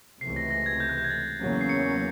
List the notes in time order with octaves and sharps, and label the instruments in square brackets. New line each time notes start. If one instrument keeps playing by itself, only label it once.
[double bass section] C#2 C3 E3 A3 [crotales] C7
[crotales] A#6
A#6
G#6
G6
F#6
G6
G#6
A6
[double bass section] E2 C#3 F#3 A#3 C#4
[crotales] C7
C#7